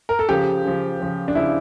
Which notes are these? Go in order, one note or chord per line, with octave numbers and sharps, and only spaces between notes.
A#4
A4
C#3 F3 G4
C#3 F3
C#3 F3
D4
C#3 F3 E4